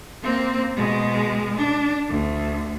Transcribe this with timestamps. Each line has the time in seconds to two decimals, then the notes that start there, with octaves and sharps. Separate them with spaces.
0.22 A#3 C4
0.76 B2 G#3
1.58 D4
2.09 D2